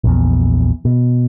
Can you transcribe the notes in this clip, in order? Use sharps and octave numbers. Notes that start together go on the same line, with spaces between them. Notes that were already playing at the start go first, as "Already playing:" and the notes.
A#1 E2
B2